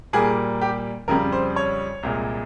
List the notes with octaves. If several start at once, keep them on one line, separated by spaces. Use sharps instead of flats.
A#2 G3 A#3 G#4
G4
F2 C#3 G3 A#4
C5
C#5
C2 A#2 G#3